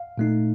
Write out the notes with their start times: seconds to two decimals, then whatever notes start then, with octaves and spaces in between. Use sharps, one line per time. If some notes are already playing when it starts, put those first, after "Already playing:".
Already playing: F5
0.18 A#2 A3 D#4